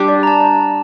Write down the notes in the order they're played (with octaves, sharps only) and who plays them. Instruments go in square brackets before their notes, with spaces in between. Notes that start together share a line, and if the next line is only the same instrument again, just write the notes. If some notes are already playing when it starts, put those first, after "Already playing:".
Already playing: [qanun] G3 D4 G4
[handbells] D5
A#5
A5